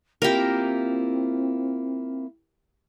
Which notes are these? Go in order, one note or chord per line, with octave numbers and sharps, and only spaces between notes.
A#3 C4 E4 F4 G4 A#4